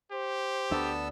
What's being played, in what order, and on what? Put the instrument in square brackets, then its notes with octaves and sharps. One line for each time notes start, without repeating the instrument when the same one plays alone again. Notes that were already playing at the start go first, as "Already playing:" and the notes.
[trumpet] G4 [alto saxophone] C5
[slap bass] D2 D4 [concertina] B3 A4 E6